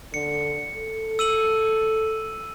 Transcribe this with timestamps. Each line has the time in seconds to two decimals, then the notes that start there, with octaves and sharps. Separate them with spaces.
0.14 D3 C#7
0.75 A4
1.19 E6 D#7 F#7